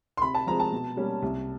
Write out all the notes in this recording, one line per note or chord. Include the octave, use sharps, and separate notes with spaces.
C6
C3 B5
A5
F3 G#3 C4 A#5
A5
B2
G3 A#3 C#4
C2